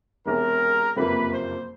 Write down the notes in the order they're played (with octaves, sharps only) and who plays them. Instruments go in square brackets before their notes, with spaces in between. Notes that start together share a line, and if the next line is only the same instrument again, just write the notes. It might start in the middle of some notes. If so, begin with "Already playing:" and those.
[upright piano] E1 E2 C3 [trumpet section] A#4
[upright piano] F#1 F2 C3 F3 A#3 [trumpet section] B4
[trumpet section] C5